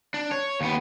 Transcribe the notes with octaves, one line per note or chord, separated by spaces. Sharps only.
D4
C#5
D#2 B3